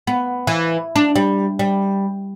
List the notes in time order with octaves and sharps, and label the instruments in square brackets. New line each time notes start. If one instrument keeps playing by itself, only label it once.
[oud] B3
E3
D4
G3
G3